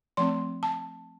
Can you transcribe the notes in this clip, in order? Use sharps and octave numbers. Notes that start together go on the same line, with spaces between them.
F3 A3 C4 C6
A5